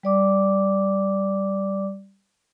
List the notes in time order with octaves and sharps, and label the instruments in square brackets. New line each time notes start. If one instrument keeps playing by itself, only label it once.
[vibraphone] G3 D5 D6